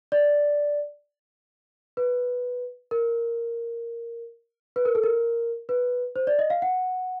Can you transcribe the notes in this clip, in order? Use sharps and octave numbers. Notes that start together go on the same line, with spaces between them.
D5
B4
A#4
B4
A#4
A4
A#4
B4
C5
D5
D#5
F5
F#5